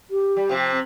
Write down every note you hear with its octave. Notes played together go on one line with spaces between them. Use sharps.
G4
G3
C3 F3
C4